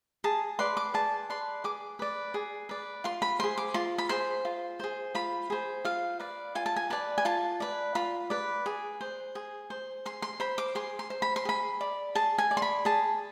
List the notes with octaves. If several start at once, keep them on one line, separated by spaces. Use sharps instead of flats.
G#4 A5
B4 D5 C6
D6
G#4 A5
B4 D5 C6
G#4 D6
B4 D5
G#4
B4 D5
F4 C6
B5
G#4 C5 C6
D6
F4 C6
B5
G#4 C5 C6
F4
G#4 C5
F4 B5
G#4 C5
F4 F5
B4 D5
F4 G#5
A5
G#5
B4 D5 A5
G#5
F4 A5
B4 D5
F4 B5
B4 D5
G#4
C5
G#4
C5
G#4 C6
C6
C5 B5
D6
G#4 C6
C6
C5
B5
C6
G#4 B5
D5
G#4 A5
G#5
D5
C6
B5
G#4 A5